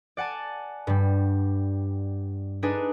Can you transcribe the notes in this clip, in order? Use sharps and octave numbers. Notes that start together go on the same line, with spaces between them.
D5 F#5 G#5 A5
G2 G3
D4 D#4 G#4 B4 G#5